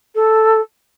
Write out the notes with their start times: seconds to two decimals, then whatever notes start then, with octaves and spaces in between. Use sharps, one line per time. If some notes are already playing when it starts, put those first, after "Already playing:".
0.15 A4